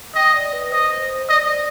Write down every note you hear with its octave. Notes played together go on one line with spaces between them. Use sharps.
D#5 G5
D5
B4
C5 D#5
D5 D#5